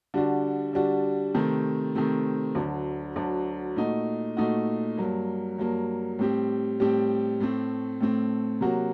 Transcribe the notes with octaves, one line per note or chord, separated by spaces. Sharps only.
D3 G3 D4 F#4
D3 G3 D4 F#4
C3 D#3 A3 C4
C3 D#3 A3 C4
D2 D3 F#3
D2 D3 F#3
A#2 A3 D#4 F#4
A#2 A3 D#4 F#4
G2 F#3 A#3
G2 F#3 A#3
A2 G3 C4 G4
A2 G3 C4 G4
A2 A3 C4
A2 A3 C4
C3 F#3 A#3 F#4